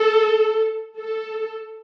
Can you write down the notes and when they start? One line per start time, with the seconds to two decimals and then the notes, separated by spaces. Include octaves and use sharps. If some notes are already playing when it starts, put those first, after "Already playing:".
Already playing: A4
0.98 A4